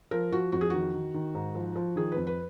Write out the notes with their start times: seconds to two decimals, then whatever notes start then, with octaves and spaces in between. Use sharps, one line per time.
0.11 F3 A#4
0.32 F3 F#4
0.52 F2 F#4
0.61 G#4
0.70 D#3 F#4
0.94 D#3
1.14 D#3
1.34 G#2
1.55 F3
1.76 F3
1.96 D#3 G#4
2.12 F2 B4
2.27 B4